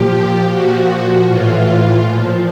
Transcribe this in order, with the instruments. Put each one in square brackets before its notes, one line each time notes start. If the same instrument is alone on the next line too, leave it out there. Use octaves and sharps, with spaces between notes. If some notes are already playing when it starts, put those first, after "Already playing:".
Already playing: [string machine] A#2 F3 G4
A#2 F3 F#4
A2 E3 F4
A#2 F3